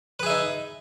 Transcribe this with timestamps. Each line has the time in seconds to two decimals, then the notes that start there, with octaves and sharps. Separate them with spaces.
0.20 B4
0.23 G#4
0.26 E5
0.30 D#4